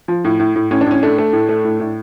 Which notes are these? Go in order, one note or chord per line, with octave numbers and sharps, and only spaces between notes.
F3
A2
A2
A2
A2 C#4
D4
A2 C#4
A3 D4
A3
A2
A3
A2
A2